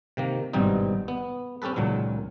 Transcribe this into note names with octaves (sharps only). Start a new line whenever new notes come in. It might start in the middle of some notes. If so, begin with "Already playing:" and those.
C3 D#3 A#3
G#1 G2 B2 G3 C4 D#4
B3
C4 C#4 G4 A4 B4
C#2 A#2 D#3 F#3